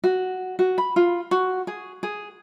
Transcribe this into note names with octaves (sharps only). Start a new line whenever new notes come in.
F#4
F#4
B5
F4
F#4
G#4
G#4